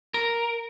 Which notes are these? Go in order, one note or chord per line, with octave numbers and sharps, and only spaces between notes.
A#4